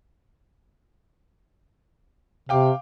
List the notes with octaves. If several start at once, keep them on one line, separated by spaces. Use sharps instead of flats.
C3 F5 G5 D6